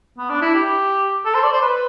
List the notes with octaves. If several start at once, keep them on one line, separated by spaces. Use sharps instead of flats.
B3
D4
E4
G4
A4
C5
D5
C5
B4